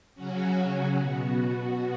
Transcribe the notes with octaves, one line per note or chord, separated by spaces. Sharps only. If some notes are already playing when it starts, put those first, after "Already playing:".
C#3 F#3 C#4 F#4
B2 B3